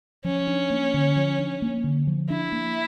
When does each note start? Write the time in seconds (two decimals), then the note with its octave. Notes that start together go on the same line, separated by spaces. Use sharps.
0.24 F3 C#4
0.47 D4
0.70 A#3
0.94 D3
1.16 F3
1.39 D4
1.62 A#3
1.84 D3
2.07 F3
2.30 D4 E4
2.52 A#3